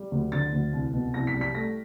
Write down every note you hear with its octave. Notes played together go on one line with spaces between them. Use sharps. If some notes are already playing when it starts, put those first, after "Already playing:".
Already playing: G3
D2
D3 A6
D2
C2
B2
C2 A#6
B6
G3
B6
A3 A#6